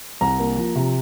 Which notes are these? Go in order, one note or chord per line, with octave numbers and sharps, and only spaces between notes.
C2 A#5
A#3
F3
C3